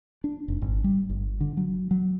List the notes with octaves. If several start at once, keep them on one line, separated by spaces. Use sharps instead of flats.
D4
F1
G#1
G3
G1
D3
F#3
F#3